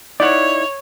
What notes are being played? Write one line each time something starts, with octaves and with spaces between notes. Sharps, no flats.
D#4 E4 C#5 D5 F#5